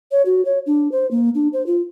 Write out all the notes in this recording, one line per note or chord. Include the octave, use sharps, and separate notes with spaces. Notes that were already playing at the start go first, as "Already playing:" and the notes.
C#5
F#4
C#5
D4
C5
A#3
D4
C5
F4